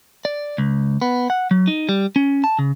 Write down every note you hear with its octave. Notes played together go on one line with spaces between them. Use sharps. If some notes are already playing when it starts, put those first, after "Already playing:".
D5
C#2
B3
F#5
F#3
D#4
G3
C#4
A5
C#3